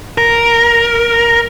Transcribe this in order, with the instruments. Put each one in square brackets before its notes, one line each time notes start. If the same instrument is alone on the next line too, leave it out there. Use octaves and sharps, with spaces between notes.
[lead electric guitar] A#4